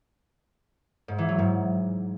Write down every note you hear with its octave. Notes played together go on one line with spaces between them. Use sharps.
G#2
E3
F#3
G#2